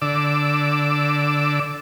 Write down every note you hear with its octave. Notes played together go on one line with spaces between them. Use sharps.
D3 D5 D6 E6